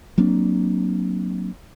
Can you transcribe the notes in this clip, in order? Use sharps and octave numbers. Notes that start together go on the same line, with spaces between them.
F#3 A#3 C4 D4